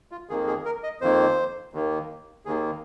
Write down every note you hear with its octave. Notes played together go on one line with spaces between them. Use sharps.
F4
F2 D#3 A#3 G#4
G#4
A#4
D#5
F2 D#3 A#3 C5
D#2 D#3 A#3
D#2 D#3 A#3 G#4